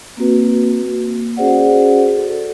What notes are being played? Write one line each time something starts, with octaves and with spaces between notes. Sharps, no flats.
A#3 C4 F#4 B4
A#3
C#4 F#4 G#4 C5 D5 F#5
A4